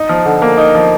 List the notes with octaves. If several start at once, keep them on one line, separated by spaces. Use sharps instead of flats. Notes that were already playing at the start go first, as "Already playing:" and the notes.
Already playing: D#4
F3
D3
A#3
D#4
F3